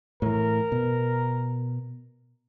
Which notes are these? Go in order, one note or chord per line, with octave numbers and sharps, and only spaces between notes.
A2 E3 A#4
B2